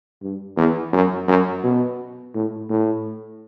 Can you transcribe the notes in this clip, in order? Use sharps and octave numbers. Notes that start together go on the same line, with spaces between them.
G2
E2
F#2
F#2
B2
A2
A2